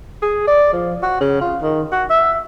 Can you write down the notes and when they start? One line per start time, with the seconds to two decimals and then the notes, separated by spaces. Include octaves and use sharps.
0.22 G#4
0.47 D5
0.73 F3
1.03 F#4
1.21 C#3
1.41 F4
1.62 D#3
1.92 F#4
2.10 E5